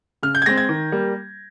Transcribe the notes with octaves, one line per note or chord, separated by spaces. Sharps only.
C#3 F6
G6
G#6
G#3 C4 A#6
G#6
D#3
G3 A#3